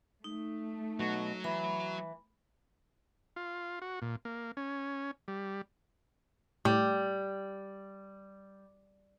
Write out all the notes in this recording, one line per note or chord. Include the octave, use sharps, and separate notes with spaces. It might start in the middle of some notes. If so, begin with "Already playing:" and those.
A3 D#4
B2 F#3 F#4
E3 B5
F4
F#4
A#2
A#3
C#4
G3
A2 G3